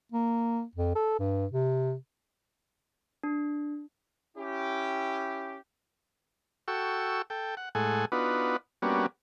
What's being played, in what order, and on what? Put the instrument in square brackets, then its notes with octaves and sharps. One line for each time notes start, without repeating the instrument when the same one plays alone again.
[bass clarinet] A#3
F2
A4
G2
C3
[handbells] D4
[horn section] C#4 E4 G4
[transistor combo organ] F#4 A4 G5 C#6 E6
A4 G5
F#5
A2 G#3 A4 F#5 G#5
B3 D4 D#4 F4 F#4 B4
G3 A#3 B3 C#4 D4 F#4